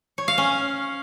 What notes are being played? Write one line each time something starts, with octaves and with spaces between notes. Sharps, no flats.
C#5
F5
C#4